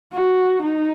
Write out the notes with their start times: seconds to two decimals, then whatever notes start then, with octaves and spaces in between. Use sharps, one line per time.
0.13 F#4
0.62 D#4